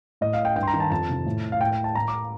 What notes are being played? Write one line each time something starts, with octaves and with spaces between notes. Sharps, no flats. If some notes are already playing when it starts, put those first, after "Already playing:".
A2 D#5
F5
G5
G2 G5
C6
A#5
D#3
A5
F2 A5
C3 D#3
A2
F5
A2 G5
G5
A5
A2 A#5
D6